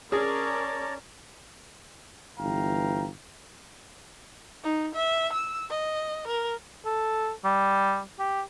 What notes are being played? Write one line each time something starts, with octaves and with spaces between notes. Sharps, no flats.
C#4 G#4 A#4 C#5 D5 A5 A#5
G1 E3 F5 G5 A#5
D#4
E5
E6
D#5
A#4
A4
G3
G4